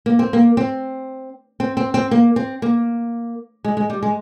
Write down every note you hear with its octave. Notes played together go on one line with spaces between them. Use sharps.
A#3
C4
A#3
C4
C4
C4
C4
A#3
C4
A#3
G#3
G#3
G3
G#3